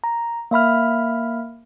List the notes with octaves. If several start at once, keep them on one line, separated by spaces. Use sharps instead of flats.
A#5
A#3 E5 B5 F6